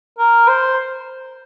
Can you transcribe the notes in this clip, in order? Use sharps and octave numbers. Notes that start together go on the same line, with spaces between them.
A#4
C5